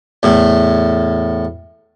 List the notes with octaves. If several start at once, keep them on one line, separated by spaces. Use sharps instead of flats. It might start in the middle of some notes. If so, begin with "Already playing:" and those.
E2 A2